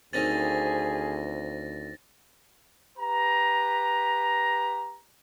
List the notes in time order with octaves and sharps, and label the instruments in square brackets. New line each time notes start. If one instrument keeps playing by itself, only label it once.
[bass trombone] D2 [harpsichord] D#3 C4 C#4 [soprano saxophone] G#4 [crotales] A6 A#6
[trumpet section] G4 B4 A#5